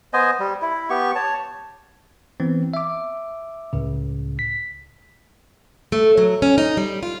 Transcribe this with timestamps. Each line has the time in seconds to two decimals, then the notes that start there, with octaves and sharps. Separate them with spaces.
0.13 B3 C5 D#5 G#5
0.39 G3
0.62 E4
0.90 B3 G4 C#6
1.15 C#5 A5
2.40 E3 B3 C4
2.74 E5 D6
3.73 C#2 A2 C#3
4.39 B6
5.92 A3
6.18 F#3
6.42 C#4
6.58 D#4
6.77 G3
7.03 F4